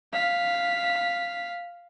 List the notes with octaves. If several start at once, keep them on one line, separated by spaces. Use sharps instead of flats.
F5 B6